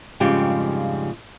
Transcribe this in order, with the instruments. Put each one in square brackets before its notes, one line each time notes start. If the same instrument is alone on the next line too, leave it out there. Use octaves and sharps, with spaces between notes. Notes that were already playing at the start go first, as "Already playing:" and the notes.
[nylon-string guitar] F2 G#2 C#3 G3 F4 G4